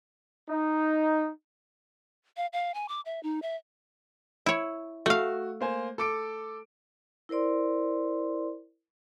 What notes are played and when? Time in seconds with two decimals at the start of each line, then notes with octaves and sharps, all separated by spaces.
0.48 D#4
2.37 F5
2.53 F5
2.74 G#5
2.89 D6
3.06 E5
3.23 D#4
3.42 E5
4.46 E4 C#5
5.06 A3 F#4 F5
5.61 A#3 C5 G#5
5.98 A4 D6 D7
7.29 E4 A#4 C5 D5 C6